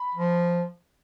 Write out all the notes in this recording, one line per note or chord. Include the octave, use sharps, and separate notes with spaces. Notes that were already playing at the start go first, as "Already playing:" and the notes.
Already playing: B5
F3